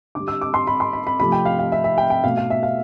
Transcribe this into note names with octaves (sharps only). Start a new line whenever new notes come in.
D3 G3 D6
E6
D6
C6
B5
C6
B5
B5
C3 F3 A3 B5
G5
F5
F5
E5
E5
G5
G5
B2 A3 F5
F5
E5
F5